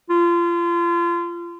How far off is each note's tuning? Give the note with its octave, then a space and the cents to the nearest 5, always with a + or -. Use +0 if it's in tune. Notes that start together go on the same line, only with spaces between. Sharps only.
F4 -30